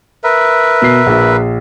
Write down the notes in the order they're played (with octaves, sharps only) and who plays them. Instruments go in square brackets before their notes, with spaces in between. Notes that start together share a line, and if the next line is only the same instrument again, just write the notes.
[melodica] A#4 B4 E5
[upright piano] B2 C7
A#1